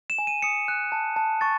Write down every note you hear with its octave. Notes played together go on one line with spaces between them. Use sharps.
E7
G#5
D#7
D#6 C#7
F#6
A5
A5
C#6 A6